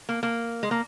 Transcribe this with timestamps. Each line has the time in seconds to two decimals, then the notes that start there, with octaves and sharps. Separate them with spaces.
0.09 A#3
0.23 A#3
0.63 G#3
0.71 A#3